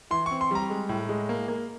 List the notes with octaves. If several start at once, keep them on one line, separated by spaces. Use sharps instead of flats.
E3 C6
C4 C#6
C6
G3 A#5
G#3
A2
G#3
A#3
A#3